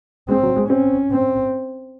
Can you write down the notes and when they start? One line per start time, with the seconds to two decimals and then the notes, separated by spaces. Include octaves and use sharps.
0.29 G#3 C4
0.43 F#3
0.56 G#3
0.69 C4 C#4
1.11 C4